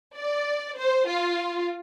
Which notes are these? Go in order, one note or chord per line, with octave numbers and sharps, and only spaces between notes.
D5
C5
F4